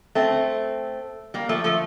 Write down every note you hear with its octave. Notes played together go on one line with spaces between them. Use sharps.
A3 C4
G3 A#3
F3 A3
F3 A3